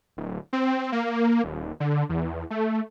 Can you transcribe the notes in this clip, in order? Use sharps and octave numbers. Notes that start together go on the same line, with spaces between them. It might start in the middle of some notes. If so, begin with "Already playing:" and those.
D1
C4
A#3
D#1
D3
E2
A3